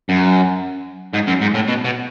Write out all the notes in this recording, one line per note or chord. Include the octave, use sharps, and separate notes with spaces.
F#2
G#2
F#2
G#2
A2
B2
B2